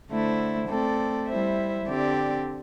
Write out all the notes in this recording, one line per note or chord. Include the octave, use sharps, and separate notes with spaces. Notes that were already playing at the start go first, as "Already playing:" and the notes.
D3 A3 E4 C5
A3 C4 A4 D5
G3 E4 C5 E5
D3 C4 G4 D5